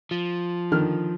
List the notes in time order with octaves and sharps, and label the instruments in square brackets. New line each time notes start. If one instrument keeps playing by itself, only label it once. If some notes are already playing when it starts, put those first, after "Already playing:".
[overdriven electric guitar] F3
[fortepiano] D3 D#3 F6